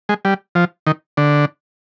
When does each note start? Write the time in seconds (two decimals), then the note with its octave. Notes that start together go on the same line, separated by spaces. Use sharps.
0.09 G#3
0.25 G3
0.55 F3
0.87 D#3
1.17 D3